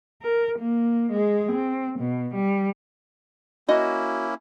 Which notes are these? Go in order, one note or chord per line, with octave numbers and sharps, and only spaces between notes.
A#4
A#3
G#3 G#4
C4
B2
G3
A#3 C#4 E4 F#4 D#5